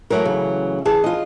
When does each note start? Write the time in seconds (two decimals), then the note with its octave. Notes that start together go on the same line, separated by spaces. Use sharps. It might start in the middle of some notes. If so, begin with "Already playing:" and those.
0.10 E3 F#3 A3 A#4
0.25 C#3
0.86 E3 G#4 A5
1.04 F4 D#5